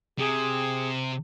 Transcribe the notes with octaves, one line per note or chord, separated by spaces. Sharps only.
C3 G#4